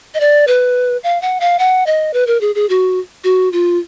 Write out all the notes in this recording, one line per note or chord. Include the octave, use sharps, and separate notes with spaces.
D#5
D5
B4
F5
F#5
F5
F#5
D#5
B4
A#4
G#4
G#4
F#4
F#4
F4